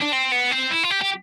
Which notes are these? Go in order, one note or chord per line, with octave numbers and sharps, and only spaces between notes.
D4
C4
B3
C4
E4
F4
G4
G4